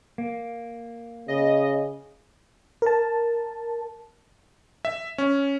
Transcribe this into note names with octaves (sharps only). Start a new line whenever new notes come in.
A#3
C#3 D#5
A#4 A5
E5
C#4